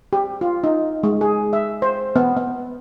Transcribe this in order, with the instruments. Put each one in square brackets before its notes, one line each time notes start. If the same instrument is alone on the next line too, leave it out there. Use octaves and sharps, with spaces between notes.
[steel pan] G4
F4
D#4
G#3
G#4
E5
C5
B3
B3